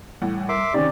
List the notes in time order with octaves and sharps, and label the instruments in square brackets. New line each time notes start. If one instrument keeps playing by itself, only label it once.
[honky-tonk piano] A2 E3 F#5 [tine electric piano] G3
[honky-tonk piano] A#4 [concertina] E5 C6 D6
[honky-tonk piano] C3 C4 [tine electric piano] D#3 D#4 [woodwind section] C#4 G4 D5